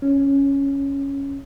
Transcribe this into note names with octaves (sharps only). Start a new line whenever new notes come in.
C#4